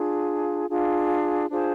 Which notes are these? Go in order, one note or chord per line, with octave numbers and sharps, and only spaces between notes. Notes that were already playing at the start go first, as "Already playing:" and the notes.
Already playing: D4 F4 G#4
D4 F4 G#4
D4 F4 G#4 C5